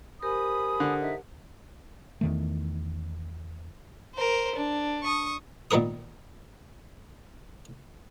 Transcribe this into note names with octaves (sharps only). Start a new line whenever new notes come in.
G4 A#4 C5 G#5 B5 D#6
D3
D#4 E5
E2 D#3 A3
A#4 C5
D4
C#6 D#6
A#2 D#3 B3 A#4 D#6